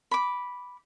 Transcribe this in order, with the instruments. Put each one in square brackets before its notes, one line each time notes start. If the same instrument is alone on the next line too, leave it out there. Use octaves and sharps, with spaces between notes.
[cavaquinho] B5 D6